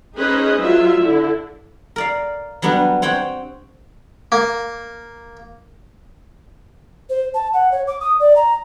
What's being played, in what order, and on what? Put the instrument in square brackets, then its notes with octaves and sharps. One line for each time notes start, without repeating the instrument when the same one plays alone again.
[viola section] C#4 D#4 G#4 B4 C5 D#5
F#3 F4 E5
D3 E4
[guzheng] A#4 D5 F5
F#3 G3 B3 D4
C4 C#5 F#5 G5
[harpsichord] A#3
[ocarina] C5
A5
F#5
C#5
D6
D#6
D5
A#5